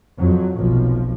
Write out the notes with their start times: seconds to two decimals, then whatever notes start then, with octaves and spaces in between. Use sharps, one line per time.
0.18 F2 F#3
0.55 F1 B1 F3